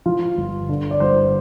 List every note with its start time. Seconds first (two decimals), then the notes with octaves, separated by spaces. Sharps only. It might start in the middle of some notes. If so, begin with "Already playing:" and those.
0.06 F3 F4
0.38 G1
0.69 D3
0.91 D5
1.00 G1 C5